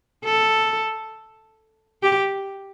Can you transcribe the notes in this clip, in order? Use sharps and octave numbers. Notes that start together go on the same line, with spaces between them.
A4
G4